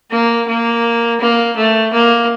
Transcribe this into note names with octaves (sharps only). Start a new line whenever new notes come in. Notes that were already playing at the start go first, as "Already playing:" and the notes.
A#3
A#3
A#3
A3
A#3